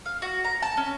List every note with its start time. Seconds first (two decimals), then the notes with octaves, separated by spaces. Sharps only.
0.06 F5
0.22 F#4
0.45 A#5
0.62 A5
0.77 C#4